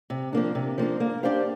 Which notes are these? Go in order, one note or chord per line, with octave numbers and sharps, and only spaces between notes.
C3
F3 A#3 D4
C3
F3 A#3 D4
A#3
D4 G4 C5 F5